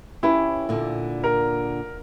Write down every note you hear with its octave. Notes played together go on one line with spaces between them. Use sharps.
C#4 E4 G4 B4
A#2 D3 D4
A#4